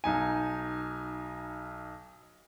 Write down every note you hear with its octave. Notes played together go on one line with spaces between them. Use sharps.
B1 D#4 G#5